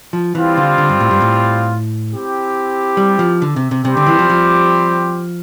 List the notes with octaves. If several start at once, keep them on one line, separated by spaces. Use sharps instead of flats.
F3
E3 G3 C4 F4
D3
D3
G2
A2
G2
A2
C4 E4 G4
G3
F3
D3
C3
C3
C3 G3 C4 G4 C5
D3
E3
F3
F3